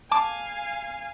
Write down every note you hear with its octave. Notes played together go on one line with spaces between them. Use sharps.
F5 G#5 A5 D6